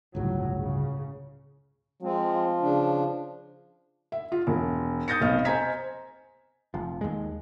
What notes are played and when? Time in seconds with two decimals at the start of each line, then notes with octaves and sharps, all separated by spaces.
0.15 G1 C#2 A2 F#3
0.56 C#3
2.03 F3 G#3 C4
2.62 C#3 D4
4.12 E5
4.32 F4
4.47 E1
5.08 D#6 G6 A6 A#6 C#7
5.21 F1 B1 D#5 F6
5.45 C5 D#5 G#5 A#5 G#6 B6
6.74 F1 F3
7.01 D#2 G#3